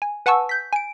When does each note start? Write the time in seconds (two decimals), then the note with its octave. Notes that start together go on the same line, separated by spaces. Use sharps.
0.02 G#5
0.26 B4 F#5 G#5 A5 C#6 E6
0.49 G6 B6
0.73 G#5 D7